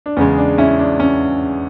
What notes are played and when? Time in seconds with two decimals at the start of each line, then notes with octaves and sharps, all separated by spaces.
0.06 D4
0.17 E2 C#3 G#3 C#4
0.38 D4
0.58 C#4 E4
0.79 D4
1.00 C#4